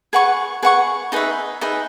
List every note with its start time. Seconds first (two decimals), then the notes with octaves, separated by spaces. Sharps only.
0.13 G#4 B4 F#5 C#6
0.63 G#4 B4 F#5 C#6
1.12 D#4 G#4 B4 E5
1.61 D#4 G#4 B4 E5